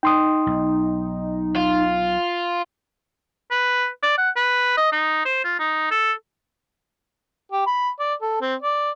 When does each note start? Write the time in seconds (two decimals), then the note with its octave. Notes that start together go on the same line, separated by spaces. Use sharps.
0.03 D#4 G5 C6 D#6
0.46 B1
1.56 F4
3.51 B4
4.03 D5
4.18 F#5
4.36 B4
4.77 D#5
4.92 D#4
5.25 C5
5.44 F4
5.59 D#4
5.91 A4
7.52 G4
7.67 B5
7.99 D5
8.21 A4
8.41 C4
8.62 D5